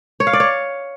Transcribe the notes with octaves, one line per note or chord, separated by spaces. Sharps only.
C#5
F5
D5
C#5